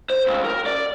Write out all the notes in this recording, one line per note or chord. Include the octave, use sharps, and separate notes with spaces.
C5
C#2
A#4
D5